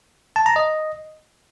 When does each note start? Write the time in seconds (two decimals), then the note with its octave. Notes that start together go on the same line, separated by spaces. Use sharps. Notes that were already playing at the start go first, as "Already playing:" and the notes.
0.36 A5
0.46 A#5
0.56 D#5